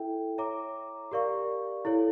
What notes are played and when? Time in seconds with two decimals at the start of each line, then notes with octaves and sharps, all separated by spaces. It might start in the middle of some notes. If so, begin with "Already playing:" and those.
Already playing: E4 A4 E5 G5
0.38 C#5 E5 A#5 D6
1.11 G4 A#4 D5 F5 C#6
1.85 E4 A4 C#5